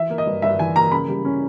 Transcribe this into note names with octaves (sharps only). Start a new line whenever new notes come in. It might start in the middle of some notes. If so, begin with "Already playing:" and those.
Already playing: E3 E5
A#3
D#5
G2
G2 E5
E3 G#5
A#3 A#5
C#3 B5
G3
C#4